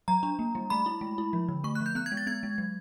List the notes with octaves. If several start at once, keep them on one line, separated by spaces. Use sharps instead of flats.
F#3 A#5
D4
A#3
G3
A3 B5
E4
G#3
E4
F3
D3
A3 C#6
F#6
F3
G6
B3 F#6
G#6
G#3
A6
B3 G#6
G#3
F#3